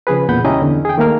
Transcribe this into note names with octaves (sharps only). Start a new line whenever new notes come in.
C#3 F3 G#4 B4
E2 A#2 F#5 B5 G6
C#2 C#4 E4 G4 D#5 A#5
E2 D3
G#4 G5
D#3 A3 A#3 A#4 F6